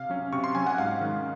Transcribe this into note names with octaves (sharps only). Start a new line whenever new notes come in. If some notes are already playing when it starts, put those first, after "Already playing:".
Already playing: C3 F5
F#3 C#4
C3 C#6
C6
F#3 C#4 G#5
F#5
G#2 F5
D#3 G#3 C#4